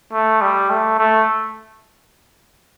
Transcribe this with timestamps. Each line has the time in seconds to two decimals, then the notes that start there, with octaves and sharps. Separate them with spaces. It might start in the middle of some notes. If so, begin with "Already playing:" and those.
0.12 A3
0.41 G3
0.70 A3
0.99 A3